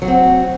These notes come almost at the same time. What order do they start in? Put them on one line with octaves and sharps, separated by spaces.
F#3 F#4 C4